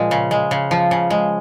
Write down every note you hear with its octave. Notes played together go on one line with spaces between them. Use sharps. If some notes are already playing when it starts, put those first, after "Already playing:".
Already playing: A#2 F3 G#3 F5
C#3
G#3
C#3
F3
C#3
G#3